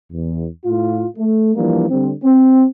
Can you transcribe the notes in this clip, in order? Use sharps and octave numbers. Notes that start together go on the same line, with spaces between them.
E2
A2 F4
A3
E3 F3 G3 A#3 D4
D3 G3 C4
C4